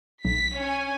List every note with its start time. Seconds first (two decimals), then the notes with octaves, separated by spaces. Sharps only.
0.25 B1 B6
0.58 C#4 G#5